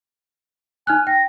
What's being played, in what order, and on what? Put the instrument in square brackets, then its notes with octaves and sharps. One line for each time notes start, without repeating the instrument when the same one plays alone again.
[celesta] D#4 F6 F#6 [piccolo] G#5
[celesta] G5 [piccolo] A#6